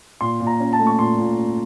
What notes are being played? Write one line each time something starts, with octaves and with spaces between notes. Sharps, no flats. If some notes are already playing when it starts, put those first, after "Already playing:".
A#2 C6
A#2
A#5
C#4
A5
A3
C#6
A#2 C6
A#2
C#4